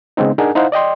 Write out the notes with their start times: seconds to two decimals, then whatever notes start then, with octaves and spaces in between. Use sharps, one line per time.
0.17 C#3 G#3 B3 C4 D#4
0.38 D4 D#4 G#4 A#4 F#5 G#5
0.55 D#4 E4 C5 F5 F#5
0.72 D5 D#5 G5 C6